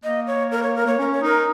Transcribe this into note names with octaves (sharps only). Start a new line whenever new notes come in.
A#3 D#5
C#5
A#4
C#5
A#4
A#3 C#5
C#4 A#4
C#5
D#4 A#4